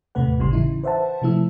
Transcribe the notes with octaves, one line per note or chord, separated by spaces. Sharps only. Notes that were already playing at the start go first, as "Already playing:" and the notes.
D#2 A2 C3 A3 B4 F#5
G#1 A2 C#3 G3 C6
C#3 E3 D#4 E4
B4 C5 E5 F#5 A5
C3 F3 A3 E4 E6